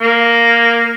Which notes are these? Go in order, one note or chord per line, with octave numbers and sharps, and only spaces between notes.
A#3